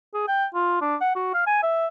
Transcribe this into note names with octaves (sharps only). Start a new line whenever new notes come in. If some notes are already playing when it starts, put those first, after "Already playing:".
G#4
G5
F4
D4
F#5
F#4
F5
G#5
E5